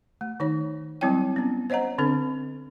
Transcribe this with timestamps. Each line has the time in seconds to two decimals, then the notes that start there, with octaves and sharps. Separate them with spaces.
0.21 A3
0.40 D#3 D#4 C#5
1.01 F#3 G3 C4 E4 C#5 G5
1.36 B3 C#4
1.70 C5 C#5 D#5 F#5 A#5
1.98 D3 C4 D4 A4